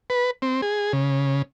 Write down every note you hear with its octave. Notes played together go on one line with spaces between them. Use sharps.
B4
C4
G#4
C#3